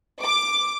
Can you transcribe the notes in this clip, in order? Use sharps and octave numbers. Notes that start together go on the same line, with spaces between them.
D6